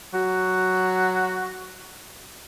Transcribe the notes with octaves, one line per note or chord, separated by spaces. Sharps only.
F#3 F#4